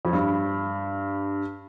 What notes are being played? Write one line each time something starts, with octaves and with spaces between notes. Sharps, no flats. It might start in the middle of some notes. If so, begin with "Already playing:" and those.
F2
G2